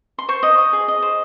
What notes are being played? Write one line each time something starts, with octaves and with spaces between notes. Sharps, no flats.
C6
C5 C#6
D#5
D#5
G#4
D#5
C5